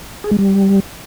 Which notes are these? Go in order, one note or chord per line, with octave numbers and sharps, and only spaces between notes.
G#4
G#3
G3